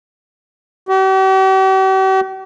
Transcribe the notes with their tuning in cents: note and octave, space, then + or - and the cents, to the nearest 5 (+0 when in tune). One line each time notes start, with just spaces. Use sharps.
G4 -45